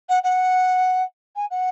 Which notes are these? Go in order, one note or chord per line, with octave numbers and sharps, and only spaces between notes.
F#5
F#5
G#5
F#5